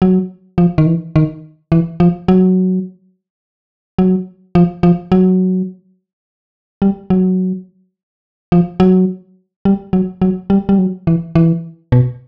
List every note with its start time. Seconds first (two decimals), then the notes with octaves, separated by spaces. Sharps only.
0.02 F#3
0.58 F3
0.78 D#3
0.86 E3
1.16 D#3
1.72 E3
2.00 F3
2.28 F#3
3.99 F#3
4.55 F3
4.83 F3
5.12 F#3
6.82 G3
7.10 F#3
8.52 F3
8.80 F#3
9.65 G3
9.93 F#3
10.22 F#3
10.50 G3
10.69 G3
10.78 F#3
11.07 E3
11.35 E3
11.92 B2